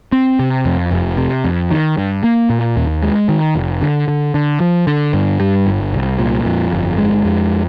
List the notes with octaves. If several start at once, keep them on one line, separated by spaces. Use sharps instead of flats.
C4
C3
F2
F1
C3
F2
D#3
G2
A#3
A#2
D#2
G#3
D#3
F1
D3
D3
D3
F3
D3
G2
G3
G1
C2
A#2
F2
G1
G#3
F2